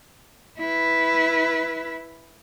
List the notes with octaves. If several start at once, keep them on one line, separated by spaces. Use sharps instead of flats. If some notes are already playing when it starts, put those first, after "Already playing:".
E4 B4